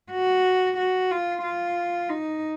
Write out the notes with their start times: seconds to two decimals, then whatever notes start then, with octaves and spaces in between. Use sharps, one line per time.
0.12 F#4
0.77 F#4
1.11 F4
1.43 F4
2.09 D#4